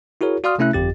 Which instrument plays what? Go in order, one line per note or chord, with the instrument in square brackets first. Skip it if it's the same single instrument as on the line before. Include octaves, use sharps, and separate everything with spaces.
[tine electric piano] E4 F#4 G#4 A#4 C#5
F#4 D5 F5 C6 D#6 F6
C3 A3 C#4 E4 E5 F#6
G1 F2 G4 A6